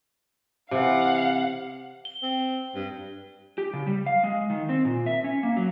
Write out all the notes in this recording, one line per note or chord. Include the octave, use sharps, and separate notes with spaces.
C3 E3 F5 F#5
G7
C4
G2
G4
C#3
G3
F5
G#3
D#3
C4
A#2
E5
C#4
A#3
F#3